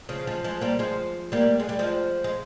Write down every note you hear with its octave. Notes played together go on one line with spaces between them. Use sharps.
C#3 F3
F3 G#3
F3 G#3
G3 A#3
F3 G#3
G3 A#3
G#3
G3
F3 G#3
G#3